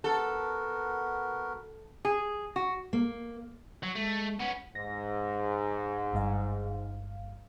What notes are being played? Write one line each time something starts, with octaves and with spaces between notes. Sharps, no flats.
B3 F#4 A4 A#4
G#4
F#4
A#3
F#3
G#3 A3
B3 C#4 F#5
G#2 A#6
G1 G2 F5